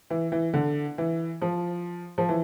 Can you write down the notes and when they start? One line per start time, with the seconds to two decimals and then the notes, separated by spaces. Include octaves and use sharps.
0.10 E3
0.32 E3
0.54 D3
0.98 E3
1.42 F3
2.18 F3
2.29 E3